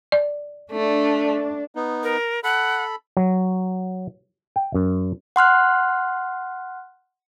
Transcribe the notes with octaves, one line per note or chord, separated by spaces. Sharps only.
D5
A3 D4
B3 D#4
A#4
A4 F#5 B5
F#3
G5
F#2
F#5 C6 F6 F#6